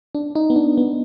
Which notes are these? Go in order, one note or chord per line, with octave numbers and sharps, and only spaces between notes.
D4
D#4
B3
D4
B3